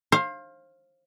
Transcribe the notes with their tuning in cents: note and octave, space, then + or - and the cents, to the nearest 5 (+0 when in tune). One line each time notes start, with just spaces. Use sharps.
C5 +35 F5 +0